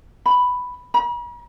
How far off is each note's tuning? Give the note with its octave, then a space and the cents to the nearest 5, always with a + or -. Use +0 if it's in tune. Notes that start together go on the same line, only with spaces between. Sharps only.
B5 +5
B5 -45